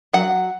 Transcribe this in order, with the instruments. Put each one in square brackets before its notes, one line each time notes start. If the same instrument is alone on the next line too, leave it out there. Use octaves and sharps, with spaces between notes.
[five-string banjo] F#3 F#5